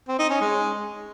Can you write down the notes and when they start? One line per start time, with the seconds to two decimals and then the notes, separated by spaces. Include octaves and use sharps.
0.08 C4
0.19 D#4
0.30 C#4
0.41 G#3